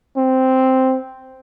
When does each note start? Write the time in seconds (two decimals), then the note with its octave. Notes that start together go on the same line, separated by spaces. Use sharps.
0.17 C4